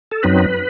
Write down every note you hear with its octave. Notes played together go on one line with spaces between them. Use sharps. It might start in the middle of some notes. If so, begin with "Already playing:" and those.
A4
F#2 F#3 C4 D#4 B4